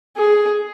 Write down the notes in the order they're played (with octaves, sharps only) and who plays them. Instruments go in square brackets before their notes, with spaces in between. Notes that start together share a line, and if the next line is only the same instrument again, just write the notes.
[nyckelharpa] G#4